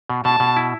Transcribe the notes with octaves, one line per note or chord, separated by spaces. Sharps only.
B2
B2 A5
B2
E4